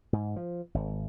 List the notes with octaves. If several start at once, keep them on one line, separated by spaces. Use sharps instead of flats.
G#2
F3
G#1